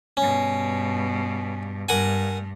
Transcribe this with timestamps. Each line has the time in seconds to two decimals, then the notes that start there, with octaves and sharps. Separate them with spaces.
0.17 G2 B2 C#4
1.89 G2 A#4 F#5 G#5